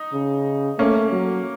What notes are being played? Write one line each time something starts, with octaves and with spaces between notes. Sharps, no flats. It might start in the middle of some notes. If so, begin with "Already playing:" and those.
Already playing: D#4
C#3
A3 A#3 C#4
F#3